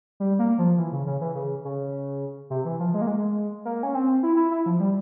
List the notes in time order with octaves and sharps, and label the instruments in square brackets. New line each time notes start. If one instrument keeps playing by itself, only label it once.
[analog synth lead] G3
A#3
F3
E3
C#3
C#3
E3
C#3
C#3
C3
E3
F3
G#3
A#3
G#3
A#3
C#4
C4
E4
E4
E4
F3
G3